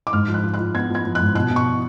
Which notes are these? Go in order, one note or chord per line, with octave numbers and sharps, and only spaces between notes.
D6
G#2 F6
F3
F#6
F4
F#6
F4
B3 G#6
F3
G#6
F3
G#2 F#6
B2 F#6
B2
C#6